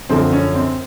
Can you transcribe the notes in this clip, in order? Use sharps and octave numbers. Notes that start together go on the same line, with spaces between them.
F#2 D3 F3 C4
C#4
C4